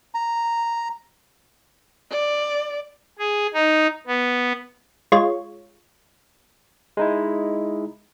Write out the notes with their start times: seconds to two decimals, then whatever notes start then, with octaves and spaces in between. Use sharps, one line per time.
0.15 A#5
2.11 D5
3.19 G#4
3.54 D#4
4.07 B3
5.12 G#3 F4 C#5
6.97 G#3 D#4 E4